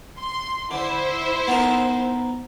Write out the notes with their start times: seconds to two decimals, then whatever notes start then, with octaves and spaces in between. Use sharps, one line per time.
0.19 C6
0.71 D3 E4 C5
1.47 B3 D#4 A#4